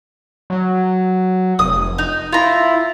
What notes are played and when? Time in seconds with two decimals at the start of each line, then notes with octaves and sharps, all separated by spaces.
0.50 F#3
1.59 F1 D#6
1.98 D#4
2.32 E4 F4 A#5